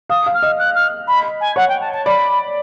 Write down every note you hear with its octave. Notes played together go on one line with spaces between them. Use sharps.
F5 D#6
F5
F6
D#5
F#6
F6
B5
G#5
C#5 F#5
G5
A5
A5
D5 B5